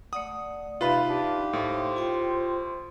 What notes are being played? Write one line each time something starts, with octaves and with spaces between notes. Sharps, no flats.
A3 D5 F#5 D#6
C3 D#4 F4 B4 E5 F5 B5
D4 G4
A2 C5
F4 G5